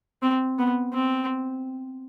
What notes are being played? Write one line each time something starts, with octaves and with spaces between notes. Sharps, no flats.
C4
B3
C4